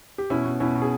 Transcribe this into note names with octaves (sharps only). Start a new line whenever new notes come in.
G4
B2 C#4 E4
B2
B2 C#4 E4
B2
G#4